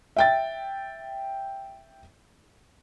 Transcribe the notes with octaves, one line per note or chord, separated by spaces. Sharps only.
E5 G5 A6